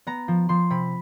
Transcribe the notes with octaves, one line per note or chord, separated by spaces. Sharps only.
B3 A#5
F3
F3 C6
C3 B5